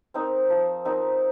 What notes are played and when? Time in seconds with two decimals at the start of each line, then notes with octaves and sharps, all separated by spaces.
0.14 C4 D#4 A#4
0.50 F3
0.85 C4 D#4 A#4